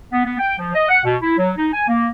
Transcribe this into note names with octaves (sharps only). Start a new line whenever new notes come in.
B3
B3
G5
F3
D#5
F#5
B2
E4
F#3
D#4
G#5
A#3